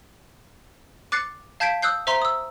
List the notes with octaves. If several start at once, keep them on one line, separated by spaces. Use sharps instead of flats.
D6 F#6 A6 C7 C#7
F5 A5 G6 G#6 B6 D7
D#6 E6 F#6 G6 C7
C5 E5 A#5 C6
D#6 E6